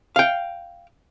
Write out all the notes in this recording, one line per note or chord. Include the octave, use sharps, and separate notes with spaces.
F5 G5